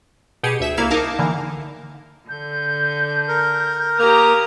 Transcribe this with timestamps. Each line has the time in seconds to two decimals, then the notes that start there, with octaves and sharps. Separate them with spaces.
0.43 B2 G4 G#4 C#7 D#7
0.60 D2 E5 E7
0.77 C2 A#3 E4 F5 G#6 E7
0.90 D#4 A#4 F5 A5 D6
1.19 D3 E3 A#3
2.29 D3 G6
3.28 A#4
3.99 A#3 G4 A#4 A#5 D#6